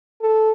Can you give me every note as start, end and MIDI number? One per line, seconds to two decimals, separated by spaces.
0.21 0.51 69